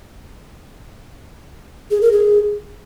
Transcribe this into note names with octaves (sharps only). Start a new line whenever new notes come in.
G#4
A#4
G#4